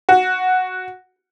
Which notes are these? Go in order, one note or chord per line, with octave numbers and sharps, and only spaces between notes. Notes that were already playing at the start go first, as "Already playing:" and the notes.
F#4